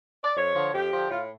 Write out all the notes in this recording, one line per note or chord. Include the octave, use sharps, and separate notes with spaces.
D5
F2 C#5
D3 F3
F2 G4
D3 F3
A2 F4